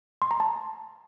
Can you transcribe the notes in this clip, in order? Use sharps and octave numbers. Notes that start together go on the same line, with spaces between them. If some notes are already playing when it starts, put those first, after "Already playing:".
C6
A#5
A5